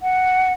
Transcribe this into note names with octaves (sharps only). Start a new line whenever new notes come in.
F#5